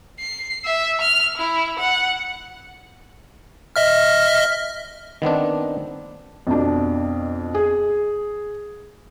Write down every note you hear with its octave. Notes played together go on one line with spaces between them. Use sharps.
C7
E5
F6
E4
F#5
D#5 E5 F6
D#3 B3 C4 D4
F2 B2 D4
G#4